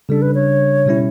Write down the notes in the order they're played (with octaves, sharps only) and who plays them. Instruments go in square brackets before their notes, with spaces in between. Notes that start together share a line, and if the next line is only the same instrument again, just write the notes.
[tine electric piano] C#3 G3 D4 [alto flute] A4
[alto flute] B4
C#5
[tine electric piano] B2 G3 C#4 E4